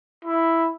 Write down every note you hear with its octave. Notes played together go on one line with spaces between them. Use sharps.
E4